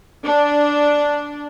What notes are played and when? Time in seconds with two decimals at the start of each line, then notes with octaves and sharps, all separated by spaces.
0.24 D4